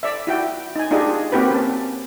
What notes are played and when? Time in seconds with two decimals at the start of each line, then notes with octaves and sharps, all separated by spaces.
0.03 D5 E5
0.27 E4 F#4 G5
0.76 D#4 G#5
0.91 D4 D#4 F4 G4 G#4 D#5
1.32 A#3 C4 F#4 G4 A#4 B4
1.51 C#4 A5